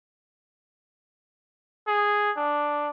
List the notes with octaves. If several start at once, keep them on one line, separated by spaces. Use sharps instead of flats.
G#4
D4